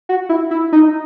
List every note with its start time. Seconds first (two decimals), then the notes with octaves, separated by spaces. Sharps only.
0.09 F#4
0.29 E4
0.51 E4
0.72 D#4